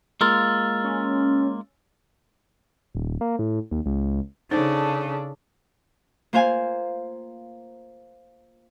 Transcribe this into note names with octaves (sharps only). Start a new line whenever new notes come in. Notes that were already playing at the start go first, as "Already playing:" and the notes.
G#3 A#3 F4 E6 F6 A6
C#4
D#1
A#3
A2
D#2
C#2
C#3 D4 D#4 A4 C5
A#3 F4 C5 F5 G#5